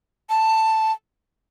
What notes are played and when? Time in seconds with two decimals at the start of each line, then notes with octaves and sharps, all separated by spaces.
0.30 A5